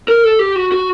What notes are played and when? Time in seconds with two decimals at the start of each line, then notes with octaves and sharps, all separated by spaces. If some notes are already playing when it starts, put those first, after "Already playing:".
0.08 A#4
0.24 A4
0.39 G4
0.56 F#4
0.72 F#4